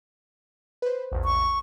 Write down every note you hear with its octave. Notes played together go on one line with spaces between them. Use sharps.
B4 C5
A#1 E2
C#6